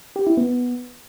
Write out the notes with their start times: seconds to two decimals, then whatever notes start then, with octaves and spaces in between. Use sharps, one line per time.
0.16 G4
0.27 E4
0.37 B3